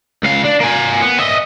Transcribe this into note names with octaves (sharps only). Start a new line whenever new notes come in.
C#2 F5
D4
A#3 G#5
B3
D#5 E5